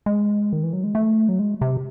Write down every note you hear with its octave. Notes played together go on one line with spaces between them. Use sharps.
G#3
D#3
E3
F#3
G#3
A3
F#3
G#3
C3